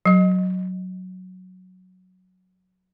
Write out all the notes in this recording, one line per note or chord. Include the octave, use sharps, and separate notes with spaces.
F#3 D#5